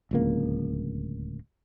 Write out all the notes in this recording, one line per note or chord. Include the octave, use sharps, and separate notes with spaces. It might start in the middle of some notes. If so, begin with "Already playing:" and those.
D1 C#2 A#3